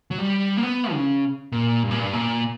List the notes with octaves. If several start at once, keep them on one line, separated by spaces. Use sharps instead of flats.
F#3
G3
A#3
B3
C#3
A#2
G2
A#2
G2
A#2